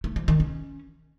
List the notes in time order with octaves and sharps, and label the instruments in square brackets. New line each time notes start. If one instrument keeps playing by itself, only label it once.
[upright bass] A3
F3
D#3
C#4